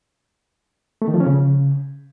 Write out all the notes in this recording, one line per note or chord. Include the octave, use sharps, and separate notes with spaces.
A3
D#3
F3
C#4
C#3